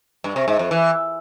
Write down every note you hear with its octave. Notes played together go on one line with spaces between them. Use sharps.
G2
C3
G#2
F2
E3